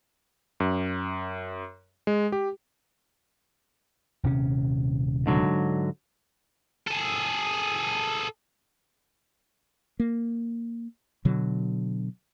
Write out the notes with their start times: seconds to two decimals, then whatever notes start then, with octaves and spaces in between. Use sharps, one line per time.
0.60 F#2
2.07 G#3
2.32 G4
4.23 D#1 C3 C#4
5.26 G#2 D3 F#3
6.87 G#4 A4
10.00 A#3
11.25 B2 D3 F#3